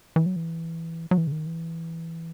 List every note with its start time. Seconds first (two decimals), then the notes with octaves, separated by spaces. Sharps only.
0.16 E3
0.26 F#3
0.36 E3
1.11 F#3
1.18 E3
1.27 C#3
1.32 D#3
1.47 E3